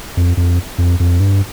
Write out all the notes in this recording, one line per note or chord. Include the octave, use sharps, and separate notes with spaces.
F2
F2
F2
F2
G2